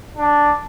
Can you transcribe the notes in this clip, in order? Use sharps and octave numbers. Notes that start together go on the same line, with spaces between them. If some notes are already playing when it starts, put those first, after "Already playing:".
D4